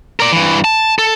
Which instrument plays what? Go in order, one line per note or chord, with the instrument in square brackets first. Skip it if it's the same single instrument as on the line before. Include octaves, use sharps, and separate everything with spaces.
[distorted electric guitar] A#4 D5
G2 E3
A5
A4